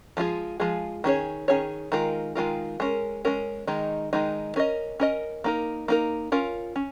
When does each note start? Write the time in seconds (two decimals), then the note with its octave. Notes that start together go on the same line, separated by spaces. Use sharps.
0.17 F3 G#3 F4 G#4
0.60 F3 G#3 F4 G#4
1.04 D#3 C#4 G#4 C#5
1.48 D#3 C#4 G#4 C#5
1.92 D#3 G#3 F4 A#4
2.35 D#3 G#3 F4 A#4
2.80 G#3 C#4 A#4
3.25 G#3 C#4 A#4
3.67 D#3 G#3 D#4
4.13 D#3 G#3 D#4
4.56 C#4 A#4 D#5
5.00 C#4 A#4 D#5
5.44 A#3 D#4 A#4
5.88 A#3 D#4 A#4
6.32 C#4 F4 A#4
6.76 C#4